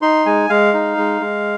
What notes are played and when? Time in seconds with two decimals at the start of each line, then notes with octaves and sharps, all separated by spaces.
0.02 D#4 C6
0.26 G#3 G#5
0.50 G#3 F5
0.74 D#4
0.97 G#3
1.21 G#3